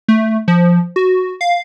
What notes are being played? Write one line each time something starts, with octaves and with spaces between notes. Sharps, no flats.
A3
F3
F#4
F5